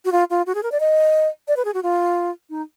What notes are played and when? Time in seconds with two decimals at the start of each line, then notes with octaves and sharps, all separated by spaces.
0.05 F#4
0.12 F4
0.30 F4
0.46 F#4
0.55 G#4
0.63 A#4
0.72 D5
0.80 D#5
1.48 D5
1.57 B4
1.65 G#4
1.74 F#4
1.83 F4
2.50 D#4